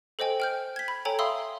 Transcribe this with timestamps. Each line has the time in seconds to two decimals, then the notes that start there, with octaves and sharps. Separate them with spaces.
0.19 A4 C5 D#5 G5 G#5
0.40 G5 F6 G6
0.76 G#6 B6
0.88 B5
1.05 A4 C#5 G5 G#5 A#5
1.19 E5 F5 B5 C6 D#6 E6